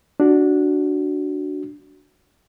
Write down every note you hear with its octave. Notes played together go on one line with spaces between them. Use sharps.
D4 F#4